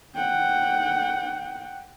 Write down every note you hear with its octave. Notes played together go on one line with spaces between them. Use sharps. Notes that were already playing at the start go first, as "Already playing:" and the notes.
F#5 G5